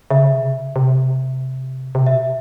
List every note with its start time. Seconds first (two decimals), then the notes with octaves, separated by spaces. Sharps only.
0.10 C#3 E5
0.32 C3
0.54 C#3
0.76 C3
1.95 C3
2.06 B2 E5